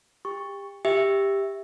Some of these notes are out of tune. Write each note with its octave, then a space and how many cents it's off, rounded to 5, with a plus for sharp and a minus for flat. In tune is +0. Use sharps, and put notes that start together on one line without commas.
G4 +30 C#6 +0
G4 +10 E5 +0